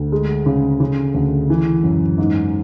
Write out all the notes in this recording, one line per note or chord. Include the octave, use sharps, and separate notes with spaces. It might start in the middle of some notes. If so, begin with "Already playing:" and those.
Already playing: D2
G#3
C#3
C#3
D2
E3
F#2
G#2